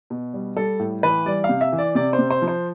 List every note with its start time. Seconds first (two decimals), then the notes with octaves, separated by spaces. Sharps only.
0.10 B2
0.34 G3
0.56 G3 A4
0.79 A2
1.03 E3 B4
1.26 G3 D5
1.44 F5
1.49 C3
1.61 E5
1.72 E3
1.78 D5
1.95 C3 D5
2.13 C5
2.19 C3
2.30 C5
2.42 F3
2.48 C5